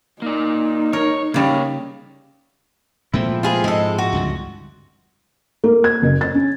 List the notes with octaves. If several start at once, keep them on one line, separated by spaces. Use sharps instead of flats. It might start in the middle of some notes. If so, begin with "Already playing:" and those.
A#3 D#4 D5
A#4 C#5
C#3 G3 A#3 C#5
A#2 F3 G#3 A3 C4 E4
F4 G#4 B4
G#2 G#3 A4
F#4
C#2 G2 D3
A#3
G#6
F#1
A6
C#4